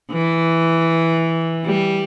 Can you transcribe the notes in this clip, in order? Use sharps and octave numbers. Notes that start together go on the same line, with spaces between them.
E3
G3